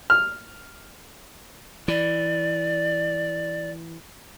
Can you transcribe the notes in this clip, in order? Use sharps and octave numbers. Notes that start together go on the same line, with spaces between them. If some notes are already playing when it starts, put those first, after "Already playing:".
F6
E3 D5